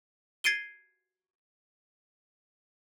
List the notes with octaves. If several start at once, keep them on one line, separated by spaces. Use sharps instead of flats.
G#6 A6 C7 D7 D#7 G7